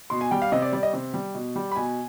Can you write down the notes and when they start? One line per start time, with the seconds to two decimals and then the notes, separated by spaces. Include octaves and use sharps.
0.10 B2 C6
0.21 G#5
0.31 G3 G5
0.42 F5
0.52 C3 D#5
0.62 D5
0.73 G3 D5
0.83 D#5
0.93 C3
1.14 G3
1.35 B2
1.56 G3
1.71 B5
1.76 B2 G#5